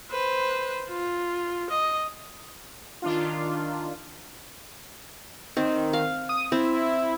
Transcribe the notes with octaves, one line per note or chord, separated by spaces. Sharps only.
B4 C5
F4
D#5
D#3 D4 F4
D#3 C4
F5
D#6
C4 E4